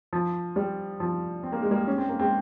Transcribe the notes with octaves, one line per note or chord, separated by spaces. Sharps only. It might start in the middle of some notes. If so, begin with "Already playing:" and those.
F3
G3
F3
C4
A#3
G#3
G3 A#3
C#4
C4
A#3
G#3 C4